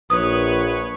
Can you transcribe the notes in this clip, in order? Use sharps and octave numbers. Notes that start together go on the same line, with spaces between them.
A#1 B4 C#5 D#6